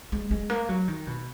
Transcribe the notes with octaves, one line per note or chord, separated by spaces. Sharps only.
G#3
G#3
A#3
F#3
D#3
B2